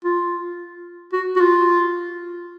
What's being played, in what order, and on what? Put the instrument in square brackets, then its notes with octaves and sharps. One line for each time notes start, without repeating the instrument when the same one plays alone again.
[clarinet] F4
F#4
F#4
F4